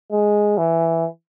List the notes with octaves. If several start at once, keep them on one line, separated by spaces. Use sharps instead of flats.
G#3
E3